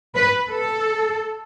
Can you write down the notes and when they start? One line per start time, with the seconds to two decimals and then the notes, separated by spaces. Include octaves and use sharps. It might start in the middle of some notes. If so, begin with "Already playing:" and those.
0.15 B4
0.51 A4